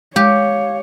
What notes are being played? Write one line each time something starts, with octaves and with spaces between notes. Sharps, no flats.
G#3 G4 C#5 F5